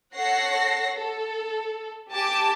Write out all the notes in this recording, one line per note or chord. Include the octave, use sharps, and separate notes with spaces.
A4 C#5 F#5 A#6 C7
A4
G4 G#5 A5 D6